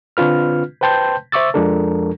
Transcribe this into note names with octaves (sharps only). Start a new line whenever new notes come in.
D3 C4 D4 F4 B4 F6
B4 C5 G5 A5 C6 G6
C5 E5 C#6 D6 E6 A6
F2 F3 G#3 D4 A4 A#4